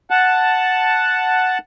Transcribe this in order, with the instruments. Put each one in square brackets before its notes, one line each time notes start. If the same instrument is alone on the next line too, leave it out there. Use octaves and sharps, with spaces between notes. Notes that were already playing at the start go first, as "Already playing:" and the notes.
[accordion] F#5 A5